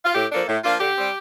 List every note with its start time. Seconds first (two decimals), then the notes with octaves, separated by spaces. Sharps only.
0.04 F4
0.15 A2 G4
0.31 F3 A#3 D4 A4
0.47 A2
0.64 F3 A#3 D4 F4
0.79 D3 G4
0.96 G3 C4